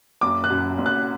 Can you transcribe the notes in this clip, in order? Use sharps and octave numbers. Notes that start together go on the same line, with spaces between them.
F#1 D6
F#6
F#2
F#1
F#6